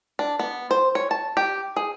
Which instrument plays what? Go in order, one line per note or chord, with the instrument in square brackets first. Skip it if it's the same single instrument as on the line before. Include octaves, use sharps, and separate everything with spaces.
[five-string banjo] D4
B3
C5
C#5
A5
G4
G#4